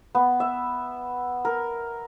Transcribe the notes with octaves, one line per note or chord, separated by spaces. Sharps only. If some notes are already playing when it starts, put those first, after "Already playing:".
B3
E5
A#4